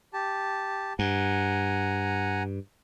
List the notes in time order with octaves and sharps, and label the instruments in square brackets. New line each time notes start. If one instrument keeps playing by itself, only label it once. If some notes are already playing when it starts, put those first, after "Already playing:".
[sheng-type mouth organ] G4 A5
[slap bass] G2 [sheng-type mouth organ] F#5 G#5 A#5